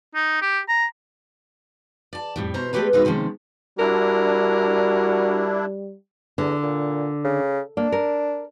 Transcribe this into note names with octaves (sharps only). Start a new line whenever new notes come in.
D#4
G4
A#5
D5 A5
F2 A2 G3
B2 C5 E5 A#5
G#3 A3 D#4 G4 B4 C#5
B2 E3 G#3 D#4 F#4 B4
C3 D#3 F3 G#3 C#4
G3 D4 E4 F#4 A#4
E2 D3
A#2
C#3
A#3 D4
A#4